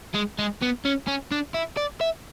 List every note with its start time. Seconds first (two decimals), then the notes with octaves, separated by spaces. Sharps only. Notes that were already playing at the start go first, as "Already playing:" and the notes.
0.15 G#3
0.39 G#3
0.62 B3
0.85 C#4
1.07 C#4
1.32 D4
1.54 E4
1.77 D5
2.01 E5